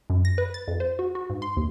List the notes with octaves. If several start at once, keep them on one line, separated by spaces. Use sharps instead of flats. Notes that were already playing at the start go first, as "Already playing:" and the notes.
F#2
A#6
B4
A6
F2
C5
F#4
F#4
G#2
C6
D#2